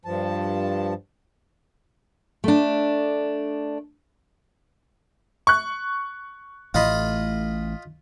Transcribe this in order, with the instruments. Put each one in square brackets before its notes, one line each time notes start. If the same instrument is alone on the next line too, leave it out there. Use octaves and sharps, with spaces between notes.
[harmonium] G2 F3 A5
[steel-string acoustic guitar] A3 D4
[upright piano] C#6 F#6
[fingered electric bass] A1 A2 [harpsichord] F4 D#5 B5